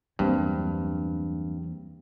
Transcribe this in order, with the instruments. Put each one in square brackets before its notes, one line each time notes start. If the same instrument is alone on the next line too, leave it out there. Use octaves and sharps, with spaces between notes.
[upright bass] E2 [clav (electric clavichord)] G2 [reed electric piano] F#3 A#3 C4